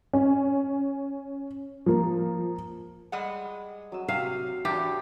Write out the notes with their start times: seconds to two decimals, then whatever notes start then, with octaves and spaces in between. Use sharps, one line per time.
0.13 C#4
1.86 F3 A#3
3.12 G3 G#3 F#5
3.92 F#3 D#6 E6
4.08 C3 F5
4.65 E2 D4 G4 D5 C#6